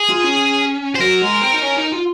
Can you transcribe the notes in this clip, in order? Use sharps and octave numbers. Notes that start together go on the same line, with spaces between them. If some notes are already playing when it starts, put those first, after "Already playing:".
Already playing: G#4
F4
C#4
C5
F#3 A#4
G#3
C4
D#4
C#4
D#4
F4